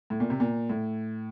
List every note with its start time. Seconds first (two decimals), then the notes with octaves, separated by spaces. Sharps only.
0.10 A2
0.20 A#2
0.30 C3
0.40 A#2
0.69 A2